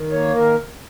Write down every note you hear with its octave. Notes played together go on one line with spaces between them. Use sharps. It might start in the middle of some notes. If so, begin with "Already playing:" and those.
Already playing: D#3
A#3 C#5
D#3 A#4